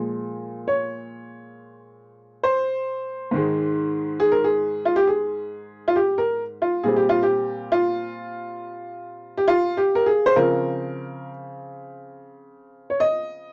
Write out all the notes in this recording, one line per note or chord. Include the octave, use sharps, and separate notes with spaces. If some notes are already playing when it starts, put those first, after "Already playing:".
Already playing: A#2 F3 G#3
C#5
C5
G#2 D#3 G#3
G#4
A#4
G#4
F4
G4
G#4
F4
G4
A#4
F4
A#2 G3 C4 G#4
G4
F4
G4
F4
G4
F4
G4
A#4
G#4
C5
C#3 F3 C4 A#4
C#5
D#5